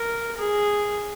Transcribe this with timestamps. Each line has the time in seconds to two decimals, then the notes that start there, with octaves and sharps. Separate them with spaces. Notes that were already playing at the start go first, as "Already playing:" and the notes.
Already playing: A#4
0.37 G#4